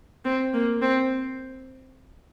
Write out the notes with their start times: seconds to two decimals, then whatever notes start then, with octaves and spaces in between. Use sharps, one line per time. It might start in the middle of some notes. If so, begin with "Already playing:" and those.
0.25 C4
0.53 A#3
0.81 C4